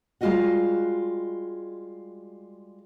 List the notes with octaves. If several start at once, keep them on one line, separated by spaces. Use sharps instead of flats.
G3 G#3 F4 F#4 D#5 F#5